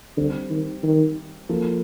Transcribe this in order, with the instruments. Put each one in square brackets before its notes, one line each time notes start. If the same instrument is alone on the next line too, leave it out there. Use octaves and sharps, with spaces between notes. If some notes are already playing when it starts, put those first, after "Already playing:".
[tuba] D3 [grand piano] G3 C4 G4
[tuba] D#3
D#3
[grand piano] F3 A#3 F4 A4